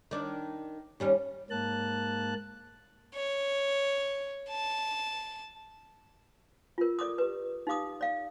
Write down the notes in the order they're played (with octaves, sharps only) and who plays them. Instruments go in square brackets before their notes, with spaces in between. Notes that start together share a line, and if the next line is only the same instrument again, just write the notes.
[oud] D#3 D4
D#2 G3 C#4
[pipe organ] G#2 A#3 A5 F#6
[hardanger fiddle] C#5
A5
[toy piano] F4 A#4
A4 D5 D6 D#6
G4 B4
D#4 G4 F5 D6 D#6
D5 F5